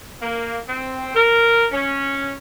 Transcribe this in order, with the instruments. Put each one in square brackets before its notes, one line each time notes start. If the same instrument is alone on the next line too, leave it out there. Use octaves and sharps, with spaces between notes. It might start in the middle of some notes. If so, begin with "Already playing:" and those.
[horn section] A#3
C4
A#4
C#4